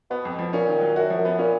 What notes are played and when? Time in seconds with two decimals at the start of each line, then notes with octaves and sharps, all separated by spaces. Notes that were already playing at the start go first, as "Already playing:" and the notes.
0.10 B2 B3
0.25 F2
0.39 F3
0.53 A#2 C#4
0.67 D#3
0.81 F#3
0.96 F#2 F#4
1.10 F3
1.18 F#2
1.25 B3
1.38 A#2 C#4